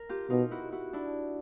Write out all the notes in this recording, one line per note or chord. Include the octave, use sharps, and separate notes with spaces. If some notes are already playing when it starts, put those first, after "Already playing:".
Already playing: A#4
F4 G4
B2 D#4 F4
E4 F#4
E4 F#4
D4 E4